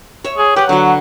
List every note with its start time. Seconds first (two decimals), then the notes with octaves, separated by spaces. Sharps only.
0.24 C#5 E5
0.38 G#4
0.56 G4 B4 F#5
0.69 D3 F#3 F#4